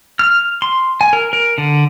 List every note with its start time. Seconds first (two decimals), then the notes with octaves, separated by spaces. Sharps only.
0.19 F6
0.62 C6
1.01 G#5
1.13 A#4
1.33 A#4
1.58 D3